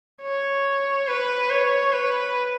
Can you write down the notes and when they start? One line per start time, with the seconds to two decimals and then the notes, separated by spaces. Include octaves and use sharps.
0.22 C#5
1.07 B4
1.49 C#5
1.93 B4